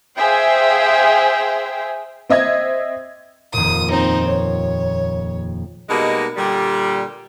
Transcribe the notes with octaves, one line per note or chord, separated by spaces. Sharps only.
G#4 C5 E5 F5 G5 G#5
C4 D#5 E5 G#6
D#1 F2 A#2 D#6
C4 D#4
C#5
B2 G3 G#3 A#3 D#4
A#2 D3 G3